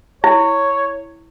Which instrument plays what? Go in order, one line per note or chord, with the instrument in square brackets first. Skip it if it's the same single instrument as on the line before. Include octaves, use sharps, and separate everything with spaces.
[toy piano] E4 [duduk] C#5